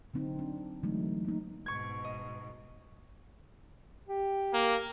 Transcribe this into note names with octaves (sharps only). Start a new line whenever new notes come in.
D3 F#3 C4 D#4
D4
D3 E3 F#3 G#3 A3 D#4
A#3 D#4
G#2 B2 C#6 G#6
D#5
G4
A#3